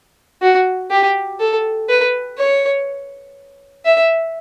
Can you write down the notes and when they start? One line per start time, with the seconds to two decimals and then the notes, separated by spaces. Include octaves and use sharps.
0.42 F#4
0.91 G4
1.39 A4
1.89 B4
2.38 C#5
3.85 E5